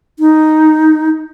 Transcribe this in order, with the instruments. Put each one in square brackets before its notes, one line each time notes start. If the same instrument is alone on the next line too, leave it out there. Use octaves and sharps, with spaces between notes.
[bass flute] D#4